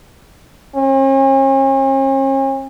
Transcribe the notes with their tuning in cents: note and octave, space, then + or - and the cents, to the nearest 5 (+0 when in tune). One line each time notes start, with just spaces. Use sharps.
C#4 -45